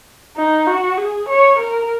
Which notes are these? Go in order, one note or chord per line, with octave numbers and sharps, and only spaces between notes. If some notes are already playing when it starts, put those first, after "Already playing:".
D#4
F#4
G#4
C#5
A#4